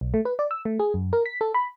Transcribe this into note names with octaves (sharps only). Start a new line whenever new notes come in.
B1
A3
B4
D5
E6
A3
G#4
F#2
A#4
B6
A4
B5